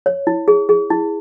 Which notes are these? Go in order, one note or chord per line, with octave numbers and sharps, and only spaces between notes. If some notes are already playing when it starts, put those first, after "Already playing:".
C#5
E4
G#4
G#4
E4